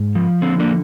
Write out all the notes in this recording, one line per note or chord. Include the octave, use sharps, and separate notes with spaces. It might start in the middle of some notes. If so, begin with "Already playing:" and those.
Already playing: G#2
F3
D3 C4
A#3 D4